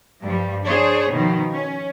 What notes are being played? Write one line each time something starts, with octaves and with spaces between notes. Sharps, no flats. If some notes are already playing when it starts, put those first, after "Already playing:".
G2 F3 G3
D4 G#4 C5 C#5
B2 D#3 F3
C#4